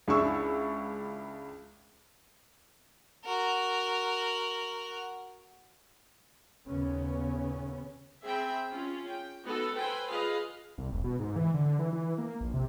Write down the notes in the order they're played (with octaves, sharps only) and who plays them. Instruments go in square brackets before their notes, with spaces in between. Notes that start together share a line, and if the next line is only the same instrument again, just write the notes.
[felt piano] C#2 D4 E4 C#6 E6
[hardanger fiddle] F#4 A#4
[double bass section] D#2 A#2 C#3 B3 C#4
[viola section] C4 G#4 E5 G5 B5
C#4 F4 G#4
G5
B3 D#4 F#4 A4
A4 B4 C5 G5 G#5
F4 G#4 B4 D#5 F5
[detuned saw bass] C2
E1
B2
G#2
E3
D3
E3
E3
A#3
A#1
C3